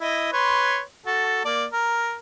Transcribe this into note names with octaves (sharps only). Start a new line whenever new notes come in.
E4 D#5
B4 C#5 C6
F#4 A4 A5
A#3 D5
A#4